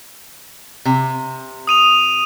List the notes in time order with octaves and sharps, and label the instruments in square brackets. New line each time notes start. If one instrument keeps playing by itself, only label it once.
[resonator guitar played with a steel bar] C3
[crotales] D#6 D#7 F7